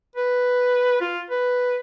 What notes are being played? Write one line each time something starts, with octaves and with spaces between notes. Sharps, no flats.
B4
F4
B4